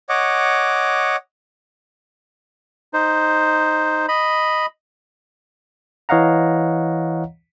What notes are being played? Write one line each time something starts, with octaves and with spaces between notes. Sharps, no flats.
C#5 D#5 F#5 D6
D#4 C5
D#5 B5
E3 C#5 D#5 F5 F#5 A#5